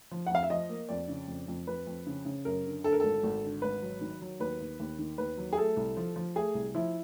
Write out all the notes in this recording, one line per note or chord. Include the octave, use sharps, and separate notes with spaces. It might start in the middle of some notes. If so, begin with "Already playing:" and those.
F3
F#5
F2 F5
E5
F3 D#5
A#3
F2 D5
C#3
F2
F2
F2 B4
F2
C#3
C#3
F#2 A#4
D3
D3 A4
A#4
G#1 A4
G#1
D3
G#1 B4
F#3
D#3
F#3
D#2 B4
D#2
D#2
D#3
D#2 B4
F#3
G#4
A3 A4
C2
F3
F3
A3 G#4
C2
F3 E4